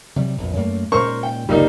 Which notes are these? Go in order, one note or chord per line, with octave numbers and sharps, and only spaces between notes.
C3 F#3 G3
A#1 F2 B2
F#2 A3 A#3
A#2 G#3 C#4 A#4 C5 C#6
G5
G1 C#2 A#2 G3 A#3 D#4